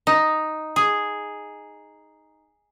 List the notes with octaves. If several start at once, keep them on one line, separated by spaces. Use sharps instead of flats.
D#4
G#4